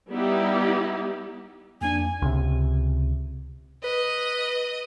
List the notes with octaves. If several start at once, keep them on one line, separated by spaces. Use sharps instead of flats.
G3 B3 D#4 E4 G4
F2 A#3 D4 G#5
C#2 C3
B4 D#5